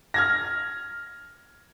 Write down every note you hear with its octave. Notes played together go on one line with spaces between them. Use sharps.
F6 G#6 A#6